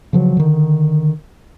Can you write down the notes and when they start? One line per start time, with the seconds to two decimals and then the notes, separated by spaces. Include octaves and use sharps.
0.13 C#3 F3 F#3
0.37 D3 D#3